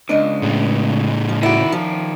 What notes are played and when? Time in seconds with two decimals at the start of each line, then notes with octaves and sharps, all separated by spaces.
0.09 C#2 D4 D#5
0.43 A2 C#3
1.29 F3
1.43 D#3 E4 F#4 D5
1.72 F3